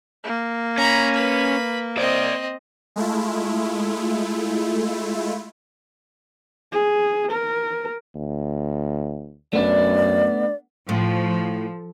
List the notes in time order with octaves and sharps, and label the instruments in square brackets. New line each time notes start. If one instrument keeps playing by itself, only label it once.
[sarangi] A#3
[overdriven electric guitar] C#4 [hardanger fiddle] A#5 B5
[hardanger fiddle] B4 B5
[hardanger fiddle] C4 D#5 [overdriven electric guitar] C5 D5
[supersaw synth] G#3 A3 E4 F4
[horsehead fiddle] G#4
A#4
[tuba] D2
[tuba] F#2 [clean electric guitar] A3 B3 D4 [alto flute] D5
[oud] A2 [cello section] F3